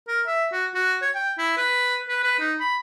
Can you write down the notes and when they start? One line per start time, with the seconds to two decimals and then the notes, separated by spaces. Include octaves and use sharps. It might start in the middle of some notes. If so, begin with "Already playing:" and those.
0.08 A#4
0.27 E5
0.52 F#4
0.75 F#4
1.02 C#5
1.15 G5
1.38 E4
1.57 B4
2.09 B4
2.24 B4
2.39 D#4
2.60 B5